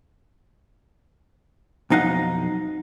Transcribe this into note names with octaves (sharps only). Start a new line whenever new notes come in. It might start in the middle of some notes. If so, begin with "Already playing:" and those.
B1 F2 D#4 F5 F#5